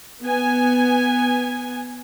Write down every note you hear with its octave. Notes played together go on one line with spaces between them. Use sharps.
B3 G#5